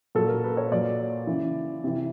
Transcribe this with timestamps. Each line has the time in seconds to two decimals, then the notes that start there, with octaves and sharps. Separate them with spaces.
0.15 A#2 F#3 A4
0.29 A#4
0.44 B4
0.57 C#5
0.71 A#2 F#3 D5
1.27 C#3 E3
1.84 C3 E3